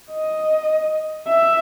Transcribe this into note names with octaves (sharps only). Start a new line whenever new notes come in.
D#5
E5